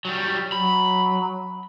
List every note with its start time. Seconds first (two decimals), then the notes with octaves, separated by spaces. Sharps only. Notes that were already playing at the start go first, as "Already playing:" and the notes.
0.05 F#3 G3
0.52 F#3 B5